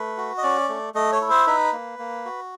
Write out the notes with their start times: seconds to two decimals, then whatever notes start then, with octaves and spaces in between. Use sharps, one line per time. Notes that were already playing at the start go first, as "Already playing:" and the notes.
Already playing: A3 B4
0.17 F#4
0.38 D#5
0.43 C#4 D5
0.69 A3
0.95 A3 D#5
1.12 C#5
1.21 E4
1.30 C5
1.47 D#4 B4
1.73 A#3
1.99 A#3
2.25 F#4